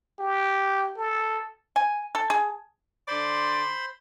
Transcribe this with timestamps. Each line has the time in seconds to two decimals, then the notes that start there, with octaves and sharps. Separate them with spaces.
0.19 G4
0.97 A4
1.76 G#5
2.15 A4
2.30 G#4
3.08 D3 C5 D5 B5 C6